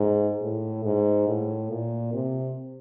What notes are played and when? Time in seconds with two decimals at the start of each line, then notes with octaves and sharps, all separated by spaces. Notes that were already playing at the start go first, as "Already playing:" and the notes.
Already playing: G#2
0.42 A2
0.84 G#2
1.28 A2
1.70 A#2
2.13 C3